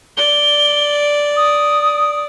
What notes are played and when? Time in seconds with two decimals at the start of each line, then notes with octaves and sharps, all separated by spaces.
0.17 D5 G7
1.36 D#6